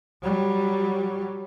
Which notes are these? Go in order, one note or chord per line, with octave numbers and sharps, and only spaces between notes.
F#3 G3